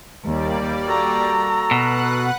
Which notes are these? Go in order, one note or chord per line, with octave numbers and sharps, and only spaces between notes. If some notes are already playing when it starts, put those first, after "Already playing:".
D#2 G3 A#3 D5
F#4 A4 A#5
B2 B4 F#5 F#6